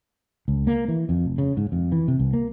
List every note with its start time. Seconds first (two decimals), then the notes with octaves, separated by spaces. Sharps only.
0.48 C#2
0.67 A#3
0.88 E3
1.09 F2
1.25 F1
1.38 C#3
1.57 G#2
1.72 F2
1.92 E3
2.08 C3
2.19 C2
2.34 A#3